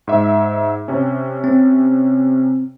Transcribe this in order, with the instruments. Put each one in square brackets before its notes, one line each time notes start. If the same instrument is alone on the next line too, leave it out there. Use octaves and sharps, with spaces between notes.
[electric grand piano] G#2 E5
C3 C#4
[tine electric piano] C4